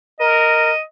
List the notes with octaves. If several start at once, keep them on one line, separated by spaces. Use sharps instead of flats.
A#4 D#5